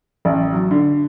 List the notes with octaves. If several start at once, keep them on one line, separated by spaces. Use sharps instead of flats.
A1
F#3
D3